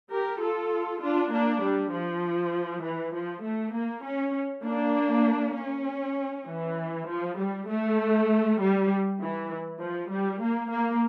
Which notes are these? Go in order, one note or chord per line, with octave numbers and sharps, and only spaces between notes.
G4 A#4
F4 A4
D4 F4
A#3 D4
G3
F3
E3
F3
A3
A#3
C#4
A#3 D4
C#4
E3
F3
G3
A3
G3
E3
F3
G3
A#3
A#3